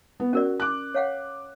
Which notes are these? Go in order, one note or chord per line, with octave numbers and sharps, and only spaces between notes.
B3
C#4 F#4 A#4 D5
D6 F#6
C#5 F5 F#5